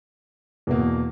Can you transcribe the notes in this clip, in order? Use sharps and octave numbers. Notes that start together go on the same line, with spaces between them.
E2 B2 A#3